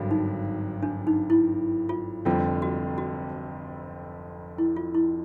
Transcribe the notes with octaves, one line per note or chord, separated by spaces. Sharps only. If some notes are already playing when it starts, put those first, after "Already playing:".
Already playing: G#1 G2 D3 F#3
D#4
D4
D#4
E4
F4
F1 F2 D3 G3 C4 F4
F#4
F#4
E4
F4
E4